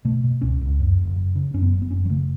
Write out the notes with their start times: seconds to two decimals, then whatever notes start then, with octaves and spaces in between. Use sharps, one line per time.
0.05 B2 A3
0.24 B2
0.41 C#2 C#4
0.61 C#2
0.80 F#2
0.98 F#1
1.16 F#1
1.35 C#3
1.54 F#2 C#4
1.62 B3
1.73 F#1
1.82 B3
1.91 F#1 C#4
2.05 F#3
2.10 C#3 A3